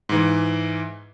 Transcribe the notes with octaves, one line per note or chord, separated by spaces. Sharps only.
G#2 E3